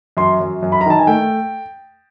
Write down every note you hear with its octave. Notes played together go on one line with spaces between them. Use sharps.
F#2 C6
F#2
F#2
B5
A#5
D#3 A5
G#5
A3 G5